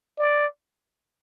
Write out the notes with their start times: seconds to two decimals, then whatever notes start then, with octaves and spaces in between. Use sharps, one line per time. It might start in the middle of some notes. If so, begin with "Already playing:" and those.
0.18 D5